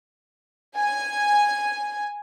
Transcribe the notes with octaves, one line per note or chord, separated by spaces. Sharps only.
G#5